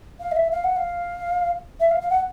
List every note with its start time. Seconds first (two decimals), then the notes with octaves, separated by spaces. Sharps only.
0.20 F5
0.32 D#5
0.36 E5
0.52 F5
0.64 F#5
0.76 F5
1.80 E5
1.91 F5
2.01 F5
2.10 F#5